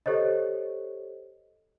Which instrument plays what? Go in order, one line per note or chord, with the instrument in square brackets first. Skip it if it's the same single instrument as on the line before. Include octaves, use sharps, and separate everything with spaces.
[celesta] G4 A4 C5 C#5 D#5